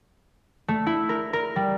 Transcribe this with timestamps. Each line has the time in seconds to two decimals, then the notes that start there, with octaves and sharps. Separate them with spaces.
0.68 A3
0.86 E4
1.09 A#4
1.33 A#4
1.56 G3